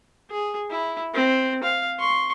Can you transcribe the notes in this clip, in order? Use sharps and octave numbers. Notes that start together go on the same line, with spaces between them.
G#4
E4
C4
F5
C6 C#6